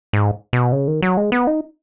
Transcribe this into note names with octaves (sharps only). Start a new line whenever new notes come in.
G#2
B2
C#3
D#3
F#3
G#3
B3
D#4